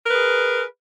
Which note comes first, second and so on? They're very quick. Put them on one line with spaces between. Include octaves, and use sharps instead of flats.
A#4 B4 G#4